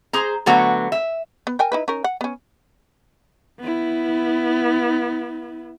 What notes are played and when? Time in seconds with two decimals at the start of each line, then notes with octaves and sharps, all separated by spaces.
0.13 G#4 C5 A#5
0.46 D3 F#3 A3 B3 F#4 C#5
0.92 E5
1.47 B3
1.59 A#4 G5 G#5
1.72 D#4 E4 B4
1.88 C#4 D#4 A#4
2.04 F#5
2.21 B3 C#4
3.60 B3 E4